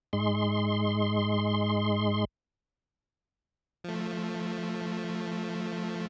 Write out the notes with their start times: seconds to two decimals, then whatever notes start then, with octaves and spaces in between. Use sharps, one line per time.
0.13 G#2 G#3 C6
3.84 F3 A3